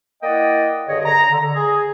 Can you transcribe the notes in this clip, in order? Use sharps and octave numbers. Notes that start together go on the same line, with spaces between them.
A#3 E4 D5 D#5 F#5 G5
G2 D3 G#4 C#5 D#5
A#5
D3
G#4